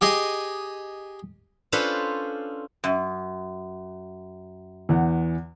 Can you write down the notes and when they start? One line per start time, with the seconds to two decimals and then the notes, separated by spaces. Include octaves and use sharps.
0.01 G4 G#4 D#5
1.72 C#4 D4 F4 A4 B4 C5
2.84 F#2
4.89 E2 E3 F#5